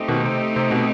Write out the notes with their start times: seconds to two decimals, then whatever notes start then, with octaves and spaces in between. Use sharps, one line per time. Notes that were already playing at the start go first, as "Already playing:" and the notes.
Already playing: A3 C4 D#4 G4
0.08 B2 D#3
0.25 C3
0.56 C3
0.71 B2